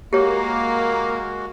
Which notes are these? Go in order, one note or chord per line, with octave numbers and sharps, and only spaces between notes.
G#3 A#3 F#4 G4 C#5